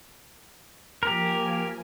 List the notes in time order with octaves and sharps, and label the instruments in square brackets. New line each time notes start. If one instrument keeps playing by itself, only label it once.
[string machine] F3 A#3 G#5 [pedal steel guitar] G4 A#4